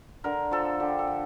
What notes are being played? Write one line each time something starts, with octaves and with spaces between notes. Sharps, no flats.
D3 A#4
F3 A4
D3 G4
A4
D3